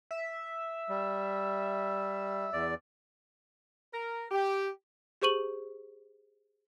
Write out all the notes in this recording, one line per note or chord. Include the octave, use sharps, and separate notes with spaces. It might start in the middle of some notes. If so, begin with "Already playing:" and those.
E5
G3
E2 D5
A#4
G4
G4 G#4 C5 C#6 D#7 F#7